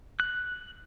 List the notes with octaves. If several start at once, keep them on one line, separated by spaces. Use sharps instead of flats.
F#6